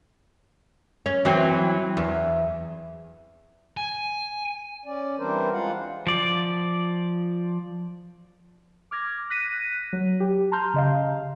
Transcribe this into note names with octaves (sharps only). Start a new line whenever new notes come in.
C#4
E3 F#3 C4
E2
G#5
C#4 D5
E3 G3 C4 D4 A#4 C5
G#3 F4 F5 F#5
F3 D5
D6 F6 G#6 A#6
F#6 A#6 B6 D#7
F#3
G4
A5 A#5 C6 F6 G6
C#3 D#5 F5